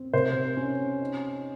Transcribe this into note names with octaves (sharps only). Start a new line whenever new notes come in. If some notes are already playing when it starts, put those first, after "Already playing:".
Already playing: C4
C3 C5
C#4
D#4